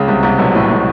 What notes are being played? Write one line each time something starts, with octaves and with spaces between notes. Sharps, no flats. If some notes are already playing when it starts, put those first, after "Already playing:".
Already playing: C#2 C#3
C2 C3
C2 C3
B1 B2
A1 A2
A2